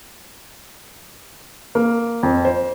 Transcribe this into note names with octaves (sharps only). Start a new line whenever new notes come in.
A#3
F2
C5